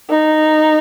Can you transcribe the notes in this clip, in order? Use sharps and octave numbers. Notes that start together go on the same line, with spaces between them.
D#4